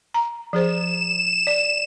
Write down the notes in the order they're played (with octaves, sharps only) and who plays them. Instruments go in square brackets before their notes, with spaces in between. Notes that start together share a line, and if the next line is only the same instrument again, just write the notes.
[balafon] A#5
[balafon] F3 G#4 C5 [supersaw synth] E7
[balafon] D5